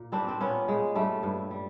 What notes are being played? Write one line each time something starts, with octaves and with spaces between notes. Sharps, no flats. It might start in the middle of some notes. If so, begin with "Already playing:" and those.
Already playing: A#2
G3 C4 D4
C4
A#2 B3 C#4
A#2 G#3
G2 G3 A3
G2
G3